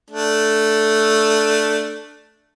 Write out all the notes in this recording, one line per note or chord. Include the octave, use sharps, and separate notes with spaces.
A3 D4